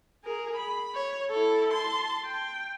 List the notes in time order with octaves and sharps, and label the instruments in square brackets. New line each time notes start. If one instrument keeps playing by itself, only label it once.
[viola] G#4 A#4
B5
C#5
E4 A4
A5 C6
G5